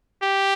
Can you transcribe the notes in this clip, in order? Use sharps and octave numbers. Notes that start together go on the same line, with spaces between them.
G4